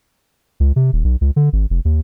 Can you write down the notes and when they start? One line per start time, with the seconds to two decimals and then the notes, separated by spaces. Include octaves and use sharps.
0.60 C#2
0.76 C3
0.93 D#1
1.04 B1
1.21 C#2
1.36 D3
1.53 G#1
1.70 F1
1.85 D#2